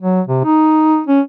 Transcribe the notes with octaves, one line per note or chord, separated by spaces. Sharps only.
F#3
C3
D#4
C#4